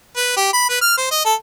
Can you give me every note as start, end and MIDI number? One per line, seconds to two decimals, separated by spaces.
0.17 0.32 71
0.37 0.51 67
0.53 0.68 83
0.69 0.81 71
0.81 0.93 89
0.97 1.10 72
1.11 1.24 75
1.25 1.34 69